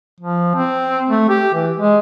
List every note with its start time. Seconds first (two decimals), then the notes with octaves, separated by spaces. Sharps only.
0.20 F3
0.55 C4
1.09 A3
1.29 G4
1.54 E3
1.76 G#3